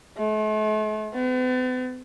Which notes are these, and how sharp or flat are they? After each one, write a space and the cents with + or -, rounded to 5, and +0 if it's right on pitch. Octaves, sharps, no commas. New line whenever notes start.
A3 -45
B3 +45